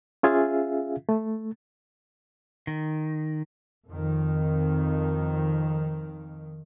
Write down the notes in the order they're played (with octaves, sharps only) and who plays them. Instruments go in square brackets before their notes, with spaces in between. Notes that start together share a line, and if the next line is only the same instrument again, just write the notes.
[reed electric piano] C#4 F4 G#4 E5 F5
A3
[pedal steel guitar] D#3
[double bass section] F2 D#3